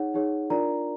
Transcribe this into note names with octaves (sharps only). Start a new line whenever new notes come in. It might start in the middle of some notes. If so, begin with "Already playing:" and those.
Already playing: D#4 G#4 C#5 F#5
D#4 G#4 C#5
D4 F4 A#4 D5 A#5